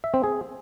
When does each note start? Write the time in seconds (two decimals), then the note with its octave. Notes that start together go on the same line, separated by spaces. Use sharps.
0.04 E5
0.14 C4
0.24 G#4